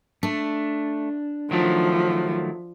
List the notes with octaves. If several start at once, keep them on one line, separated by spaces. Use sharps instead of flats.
A3 D4
D#3 F3 F#3 A3